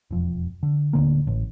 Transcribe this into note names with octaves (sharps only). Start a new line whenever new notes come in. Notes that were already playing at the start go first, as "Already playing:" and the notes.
E1 F2
D3
D1 D3 A#3
A1